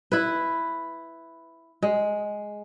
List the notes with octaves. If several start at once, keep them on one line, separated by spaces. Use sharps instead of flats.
E4 B4
G#3